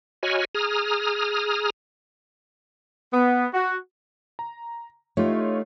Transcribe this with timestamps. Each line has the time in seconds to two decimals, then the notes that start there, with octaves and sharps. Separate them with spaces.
0.23 F#4 C#5 D#5 G#5 B5 F6
0.55 G#4 A#5 D#6 F6
3.13 B3
3.53 F#4
4.39 A#5
5.17 A3 D#4 F4 G4 C#5